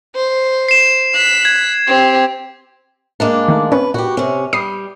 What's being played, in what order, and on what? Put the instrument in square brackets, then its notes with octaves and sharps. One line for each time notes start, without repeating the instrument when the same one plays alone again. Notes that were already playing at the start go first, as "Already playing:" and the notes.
[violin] C5
[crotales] C7 E7
[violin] F#6 B6
[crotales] G#6
[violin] C4 G4
[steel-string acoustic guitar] G#3 A#3 D4
[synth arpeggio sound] D#3 A3
[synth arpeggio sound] C4 C#4 C#5 [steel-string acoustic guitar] B4
[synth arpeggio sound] A#2 [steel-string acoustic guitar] F#4 G4
[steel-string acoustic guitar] C3 C#4
[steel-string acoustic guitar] G3 [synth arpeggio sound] D#6 C7